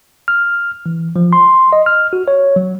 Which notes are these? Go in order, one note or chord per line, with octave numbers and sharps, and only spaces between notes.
F6
E3
F3
C6
D#5
F6
F#4
C#5
F#3